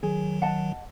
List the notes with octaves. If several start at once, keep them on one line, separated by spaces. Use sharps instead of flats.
D#3 F#3 G#4
D#5 F#5 A5